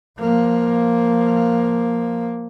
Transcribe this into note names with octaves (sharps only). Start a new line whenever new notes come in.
F3 A#3